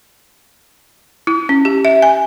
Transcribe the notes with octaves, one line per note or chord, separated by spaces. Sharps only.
E4
C#4
G4
E5
G#5